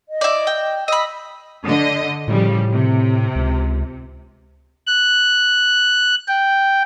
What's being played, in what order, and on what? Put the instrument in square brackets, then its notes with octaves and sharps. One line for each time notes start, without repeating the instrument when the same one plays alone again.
[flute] D#5
[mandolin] E4 D5
G5
[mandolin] D#5 B5 [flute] E6
[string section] D3 D#5
[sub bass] A2 [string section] C#3 F3 G3
[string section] C3
[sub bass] C#2
[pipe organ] F#6
G5